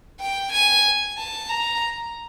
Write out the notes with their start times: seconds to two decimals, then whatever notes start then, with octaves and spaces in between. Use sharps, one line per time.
0.20 G5
0.52 G#5
1.17 A5
1.49 A#5